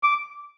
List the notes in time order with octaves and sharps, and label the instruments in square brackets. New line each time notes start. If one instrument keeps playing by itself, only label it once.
[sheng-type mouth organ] D6